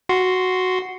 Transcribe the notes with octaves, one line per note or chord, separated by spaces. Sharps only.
F#4 C6